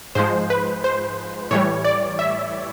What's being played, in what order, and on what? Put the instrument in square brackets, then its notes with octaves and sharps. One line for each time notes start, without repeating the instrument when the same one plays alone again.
[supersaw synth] G#2 F3 G#3 C5
B4
C5
A2 E3 G3 C#5
D5
E5